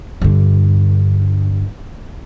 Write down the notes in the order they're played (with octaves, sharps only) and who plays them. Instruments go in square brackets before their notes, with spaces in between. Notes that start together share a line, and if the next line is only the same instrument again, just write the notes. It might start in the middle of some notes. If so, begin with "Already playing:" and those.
[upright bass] G2 D3